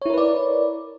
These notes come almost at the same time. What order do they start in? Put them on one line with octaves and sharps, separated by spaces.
C#5 E4 A#4 B4 D5